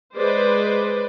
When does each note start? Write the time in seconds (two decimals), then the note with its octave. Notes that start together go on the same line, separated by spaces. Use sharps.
0.15 G#3 B4 C5 D5